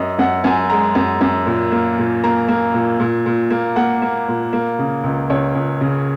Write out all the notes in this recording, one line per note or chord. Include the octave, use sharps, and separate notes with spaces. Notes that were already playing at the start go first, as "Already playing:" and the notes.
Already playing: F#2 D#5
F#2 F#5
F#2 G#5
G#3 A#5
F#2
F#2
A#2
A#3
A#2
A#3 A#5
A#3
A#2
A#2
A#2
A#3
A#3 F#5
A#3
A#2
A#3
C#3
C#2
C#2 C#5
C#2
C#3